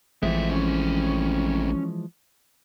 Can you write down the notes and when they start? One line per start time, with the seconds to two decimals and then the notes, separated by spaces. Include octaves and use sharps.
0.23 A1 E3 F3 G#3 A3 C4 E5
0.50 C#4